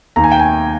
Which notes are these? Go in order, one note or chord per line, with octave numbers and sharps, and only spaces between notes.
D#2 D#3 A#5
G#5
G5
G#5